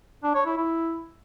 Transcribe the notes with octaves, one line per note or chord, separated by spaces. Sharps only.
D4
C#5
E4
E4